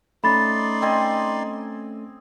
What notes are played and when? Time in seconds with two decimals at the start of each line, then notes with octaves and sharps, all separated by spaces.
0.24 A3 C#4 D#4 D5 B5 C6 A6
0.82 C4 D#5 G#5